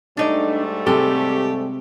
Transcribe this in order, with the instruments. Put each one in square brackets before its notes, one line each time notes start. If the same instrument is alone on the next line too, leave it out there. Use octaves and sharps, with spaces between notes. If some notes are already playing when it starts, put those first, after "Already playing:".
[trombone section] G#2 G3 A3 [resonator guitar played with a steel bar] D4 D#4 D5
[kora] C3 G#3 [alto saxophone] G4 [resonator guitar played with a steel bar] A4